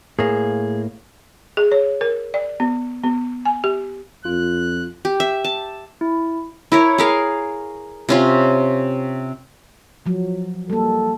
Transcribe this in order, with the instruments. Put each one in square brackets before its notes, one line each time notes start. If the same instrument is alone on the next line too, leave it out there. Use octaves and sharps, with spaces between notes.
[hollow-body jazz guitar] A2 A#3 [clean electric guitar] G#4
[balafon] G#4
C#5
A#4
D5
B3
B3
G#5
G4
[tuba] F2 [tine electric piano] F4 [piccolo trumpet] F#6
[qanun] G4
E5
A5
[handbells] E4
[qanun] E4 A#4 C#5
G#4 A#4 F5
C3 C#4 F4
[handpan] F3 F#3
[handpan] G3 A#3 [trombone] A4